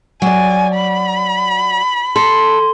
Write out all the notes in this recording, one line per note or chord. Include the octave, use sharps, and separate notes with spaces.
F#3 D5 G#5
B5
A4 C6